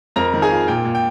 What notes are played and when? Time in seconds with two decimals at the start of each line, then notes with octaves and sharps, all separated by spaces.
0.16 F2 A#4 A#5
0.34 D#3
0.42 G#4 G#5
0.51 F4
0.68 A#2 G5
0.85 A#2
0.95 G5